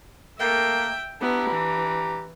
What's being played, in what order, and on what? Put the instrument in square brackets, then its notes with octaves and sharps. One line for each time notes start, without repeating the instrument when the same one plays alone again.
[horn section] A3 A#3 [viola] E5 G5
[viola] B3 E4 [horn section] D4 G4 A#5
[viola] E3